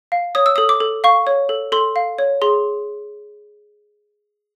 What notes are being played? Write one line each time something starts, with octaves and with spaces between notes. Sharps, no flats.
F5
C#5 D#6
E6
A4 D#6
D6
A4
F5 C#6
C#5
A4
A4 C6
F5
C#5
G#4 C6